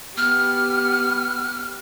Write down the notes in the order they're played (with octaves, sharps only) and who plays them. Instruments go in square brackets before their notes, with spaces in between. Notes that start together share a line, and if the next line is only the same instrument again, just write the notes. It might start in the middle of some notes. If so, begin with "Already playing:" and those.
[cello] B3 G4 [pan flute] F6